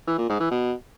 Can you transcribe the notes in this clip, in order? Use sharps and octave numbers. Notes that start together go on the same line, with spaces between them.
E3
A#2
G#2
E3
B2